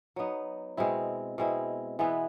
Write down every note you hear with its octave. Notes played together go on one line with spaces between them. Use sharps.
F#3 B3 D#4
B2 G#3 C4 E4
B2 G#3 C4 E4
E3 G#3 B3 E4